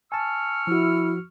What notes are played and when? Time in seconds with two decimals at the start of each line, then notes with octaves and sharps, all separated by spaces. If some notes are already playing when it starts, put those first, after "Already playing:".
0.12 G#5 A5 C#6 E6 F6
0.67 F3 E4 F#4